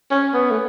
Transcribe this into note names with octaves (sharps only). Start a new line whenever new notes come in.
C#4
B3
A3